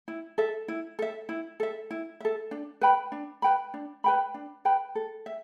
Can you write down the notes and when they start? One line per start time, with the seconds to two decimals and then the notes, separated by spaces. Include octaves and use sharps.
0.08 E4
0.38 A4 E5
0.68 E4
0.99 A4 E5
1.29 E4
1.60 A4 E5
1.91 E4
2.20 A4 E5
2.51 D4
2.81 B4 G5 B5
3.12 D4
3.42 B4 G5 B5
3.74 D4
4.04 B4 G5 B5
4.34 D4
4.65 B4 G5 B5
4.95 A4
5.26 E5